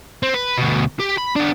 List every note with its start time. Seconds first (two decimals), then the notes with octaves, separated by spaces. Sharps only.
0.23 C4
0.34 B4
0.57 D2 B2
1.00 G4
1.18 B5
1.36 B3 D4